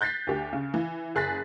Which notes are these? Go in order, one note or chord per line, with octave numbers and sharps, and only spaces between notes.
F#6 G6 A6 B6 C7
D2 G4
C#3
E3
F#1 G#4 F#6 A6 B6